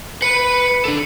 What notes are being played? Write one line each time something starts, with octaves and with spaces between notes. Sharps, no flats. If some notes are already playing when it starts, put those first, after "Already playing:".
B4 B5 C#7
D4 A4